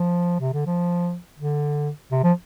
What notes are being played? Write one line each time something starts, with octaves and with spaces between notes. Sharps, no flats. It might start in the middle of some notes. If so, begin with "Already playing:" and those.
Already playing: F3
C3
D3
F3
D3
C3
F3